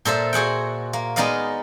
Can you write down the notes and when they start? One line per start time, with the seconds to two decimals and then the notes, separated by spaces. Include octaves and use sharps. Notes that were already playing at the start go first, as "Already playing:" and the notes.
0.05 A#2 A4 C5 E5
0.33 F#4 G#4 F#5 G5
0.93 A#3
1.16 G#3 B3 D#4 D5 D#5 F5